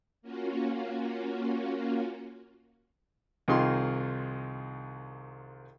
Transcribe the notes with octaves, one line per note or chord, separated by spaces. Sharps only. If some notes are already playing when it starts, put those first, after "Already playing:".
A#3 C#4 F4 F#4
C2 D#3 D#4 F4 G#4 C6